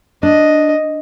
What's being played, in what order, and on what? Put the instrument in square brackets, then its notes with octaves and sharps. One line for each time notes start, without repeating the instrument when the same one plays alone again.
[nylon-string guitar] D4 [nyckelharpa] D#5